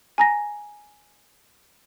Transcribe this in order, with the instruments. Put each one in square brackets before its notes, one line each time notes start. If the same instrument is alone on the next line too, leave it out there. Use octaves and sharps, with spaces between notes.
[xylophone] G#5 A#5 A#6